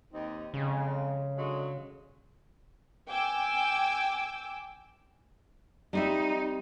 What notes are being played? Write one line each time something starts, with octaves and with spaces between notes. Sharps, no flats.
D#2 C4 D#4
F2 C#3 G#3
D3 F#3 G#3
G5 G#5 D6 E6
G3 C4 D#4 E5